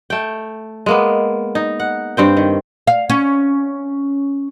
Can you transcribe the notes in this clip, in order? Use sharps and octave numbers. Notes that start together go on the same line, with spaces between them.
A3 G5
G#3 A#3 B3
D#4
F#5
G2 C4 G5
D#3
F5
C#4